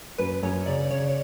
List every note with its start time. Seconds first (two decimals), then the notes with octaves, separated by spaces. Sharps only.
0.18 F#2 B4
0.43 F#2 C#5
0.66 C#3 D5
0.90 C#3 C#5